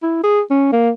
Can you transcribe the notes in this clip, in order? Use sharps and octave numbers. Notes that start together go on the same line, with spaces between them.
E4
G#4
C#4
A#3